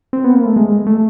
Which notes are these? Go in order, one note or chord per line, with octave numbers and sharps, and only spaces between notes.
C4
B3
A#3
A3
G#3
A3